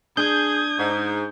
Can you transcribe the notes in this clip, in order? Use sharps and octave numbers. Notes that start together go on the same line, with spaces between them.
D4 G#4 D#6 G6 G#6
G#2